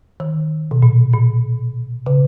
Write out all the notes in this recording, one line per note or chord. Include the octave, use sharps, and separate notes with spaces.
D#3
B2
A#2
A#2
C#3